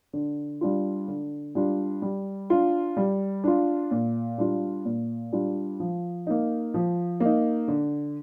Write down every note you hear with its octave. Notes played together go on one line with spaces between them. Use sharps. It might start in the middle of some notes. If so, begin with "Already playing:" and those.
D3
G3 D4 F4
D3
G3 D4 F4
G3
D4 F4
G3
D4 F4
A#2
G3 D4 F4
A#2
G3 D4 F4
F3
A#3 D#4
F3
A#3 D#4
D3